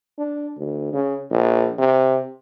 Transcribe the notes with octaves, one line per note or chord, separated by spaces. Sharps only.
D4
D2
C#3
A#1
C3